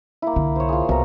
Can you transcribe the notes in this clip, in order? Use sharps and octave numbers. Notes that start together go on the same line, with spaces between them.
A#3 E4
C2 D3
C5 C#5
F4 G#4
C2 B2 A#4